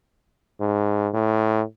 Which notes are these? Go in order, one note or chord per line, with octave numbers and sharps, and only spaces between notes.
G#2
A2